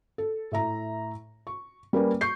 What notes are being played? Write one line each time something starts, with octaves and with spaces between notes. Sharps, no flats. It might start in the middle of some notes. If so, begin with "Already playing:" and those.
A4
A2 E5 A#5
C#6
G3 A#3 C#4 A#4 B4
C#6 G6 C7